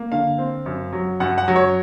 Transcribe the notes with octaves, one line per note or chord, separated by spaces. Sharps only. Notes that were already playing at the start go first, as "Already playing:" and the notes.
Already playing: A#3
D3 F5
C4
F#2
F#3
F#2 F#5
F#5
F#3
C#5